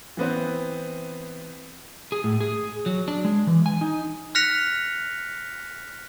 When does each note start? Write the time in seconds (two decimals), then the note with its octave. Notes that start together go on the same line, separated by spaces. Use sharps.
0.17 E3 B3 C4
2.12 G#4
2.24 A2
2.41 G#4
2.86 F#3
3.08 D4
3.25 G#3
3.47 E3
3.66 G#5
3.81 D#4
4.35 F6 F#6 A#6 B6 C#7 F7